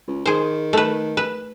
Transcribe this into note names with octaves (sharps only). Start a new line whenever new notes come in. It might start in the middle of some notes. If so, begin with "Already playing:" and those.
C#2
D#3 G#4 C5
A3 B4
B4